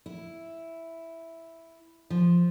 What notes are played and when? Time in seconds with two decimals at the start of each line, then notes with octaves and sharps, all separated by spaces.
0.06 E4
2.10 F3